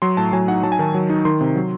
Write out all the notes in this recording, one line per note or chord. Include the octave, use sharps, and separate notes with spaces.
F#3 C6
A2 A5
F#3 G#5
D#4 F#5
F#3 A5
G#5
D#3 A5
F#3
D#4
D#3 C6
C3
F#3